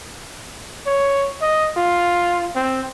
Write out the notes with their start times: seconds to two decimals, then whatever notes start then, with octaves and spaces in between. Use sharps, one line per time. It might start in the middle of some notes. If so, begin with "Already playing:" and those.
0.86 C#5
1.42 D#5
1.77 F4
2.55 C4